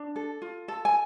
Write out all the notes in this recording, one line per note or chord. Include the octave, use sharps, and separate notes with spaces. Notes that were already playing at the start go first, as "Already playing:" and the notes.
Already playing: D4
A4
F4
A4
G#5